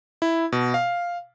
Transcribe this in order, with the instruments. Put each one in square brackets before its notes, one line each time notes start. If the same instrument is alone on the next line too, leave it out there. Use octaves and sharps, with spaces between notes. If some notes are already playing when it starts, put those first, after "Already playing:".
[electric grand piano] E4
B2
F5